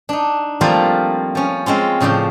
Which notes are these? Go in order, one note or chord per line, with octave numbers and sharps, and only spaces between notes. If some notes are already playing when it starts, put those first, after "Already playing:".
D4 D#4
F3 G3 A3 A#3 C4 F4
F3 C#4
G#3 C4 C#4 F4
A2 C#3 F3 D5 G5